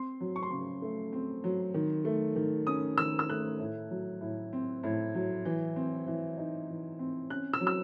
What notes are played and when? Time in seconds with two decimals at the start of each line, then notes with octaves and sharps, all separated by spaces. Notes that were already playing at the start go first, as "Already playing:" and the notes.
Already playing: C4 C6
0.20 F#3
0.36 C#6
0.43 C6
0.51 C#3 C#6
0.82 A3
1.13 C4
1.44 F#3
1.74 D#3
2.05 A3
2.36 D#3
2.67 C#4 D#6
2.98 D#3 E6
3.19 E6
3.29 A3 F#6
3.59 A2
3.90 F#3
4.21 A2
4.53 C4
4.84 A2
5.15 F#3
5.45 E3
5.76 C4
6.07 E3
6.38 D#4
6.69 E3
6.99 C4
7.30 C#4 F#6
7.53 E6
7.61 F#3
7.67 E6